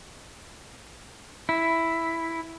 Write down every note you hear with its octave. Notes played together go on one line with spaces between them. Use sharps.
E4